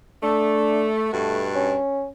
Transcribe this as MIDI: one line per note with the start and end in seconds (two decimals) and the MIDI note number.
0.23 1.09 57
0.23 0.87 62
1.13 1.77 43
1.13 1.77 47
1.13 1.46 57
1.13 1.77 66
1.56 2.07 61